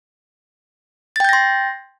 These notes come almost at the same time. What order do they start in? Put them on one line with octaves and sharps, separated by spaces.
A6 G5 G6 A#6 C6